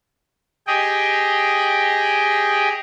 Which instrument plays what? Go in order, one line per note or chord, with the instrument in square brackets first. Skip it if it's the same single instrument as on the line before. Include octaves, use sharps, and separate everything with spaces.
[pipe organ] G4 G#4 D#5 G5